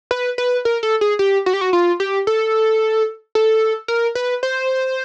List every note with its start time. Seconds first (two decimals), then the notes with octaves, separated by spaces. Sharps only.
0.11 B4
0.38 B4
0.65 A#4
0.83 A4
1.01 G#4
1.19 G4
1.46 F#4
1.53 G4
1.61 F#4
1.73 F4
2.00 G4
2.27 A4
3.35 A4
3.88 A#4
4.15 B4
4.43 C5